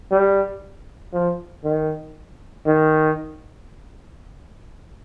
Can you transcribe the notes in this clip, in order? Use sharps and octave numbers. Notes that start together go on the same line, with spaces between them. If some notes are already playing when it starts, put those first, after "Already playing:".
G3
F3
D#3
D#3